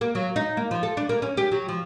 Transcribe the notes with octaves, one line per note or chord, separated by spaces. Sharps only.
A#3
F#3
D#4
A#3
F3
A4
D4
A#3
C#4
G4
F#3
F3